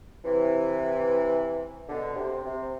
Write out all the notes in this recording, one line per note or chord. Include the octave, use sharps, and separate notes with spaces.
C3 E3
B2 D3
C3
C3